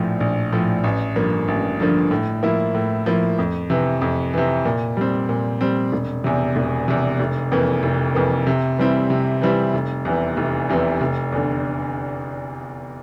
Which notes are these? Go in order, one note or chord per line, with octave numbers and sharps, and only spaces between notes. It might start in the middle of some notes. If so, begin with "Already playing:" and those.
Already playing: A#1 A2 F3
A#1
A2 F3
A1
G2 D3 F3 A#3
A1
G2 D3 F3 A#3
A2
F3 A#3 E4
A2
F3 A#3 E4
F2
C3 E3
F2
C3 E3
A#2
G3 C4
A#2
G3 C4
E1
E2 C3
E1
E2 C3
F1
F2 E3 A#3
F1
F2 E3 A#3
C3
E3 G3 C4 E4
C3
E3 G3 C4 E4
F1
E2 C3 E3
F1
E2 C3 E3
F1
E2 D3